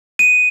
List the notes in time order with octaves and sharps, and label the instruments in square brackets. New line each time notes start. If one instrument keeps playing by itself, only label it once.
[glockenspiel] D#7